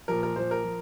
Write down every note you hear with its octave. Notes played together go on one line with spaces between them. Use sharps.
A#2 F3 A#4
A#4
A#2 F3 C5
A#4
F3